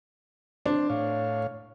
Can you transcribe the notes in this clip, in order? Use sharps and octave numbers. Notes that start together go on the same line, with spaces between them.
C4 D4 C5
A2 C#5 F5